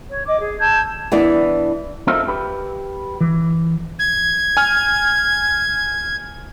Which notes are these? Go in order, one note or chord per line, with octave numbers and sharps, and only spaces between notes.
C#5
D#5 D6
G#4
A5 E6 G6 G#6
E3 B3 D4 D5
C4 D#4 F4 A4 A#4 E5
G4 B4
E3
G#6
G#5 F6